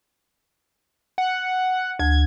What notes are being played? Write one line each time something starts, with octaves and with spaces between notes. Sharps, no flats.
F#5
D2 G#6